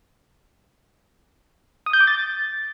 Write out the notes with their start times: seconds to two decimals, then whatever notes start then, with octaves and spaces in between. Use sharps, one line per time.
1.86 D#6
1.93 G6
2.00 D6
2.07 A6